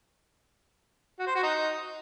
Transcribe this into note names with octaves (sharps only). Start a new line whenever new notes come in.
F#4
C5
F#4
D#4